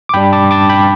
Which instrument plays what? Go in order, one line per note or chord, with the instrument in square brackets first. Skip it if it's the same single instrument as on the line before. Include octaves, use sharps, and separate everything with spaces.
[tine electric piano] D6
G2 G3 D4 G5 B5
A5 D6
A5 D6
G5 B5